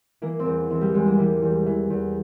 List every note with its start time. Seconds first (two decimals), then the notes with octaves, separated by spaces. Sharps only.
0.22 E3 A#3
0.39 C4
0.45 E2 A#3
0.70 E3 C4
0.81 G3
0.94 E2 G#3
1.06 A#3
1.18 E3 G3
1.42 E2
1.66 E3
1.90 E2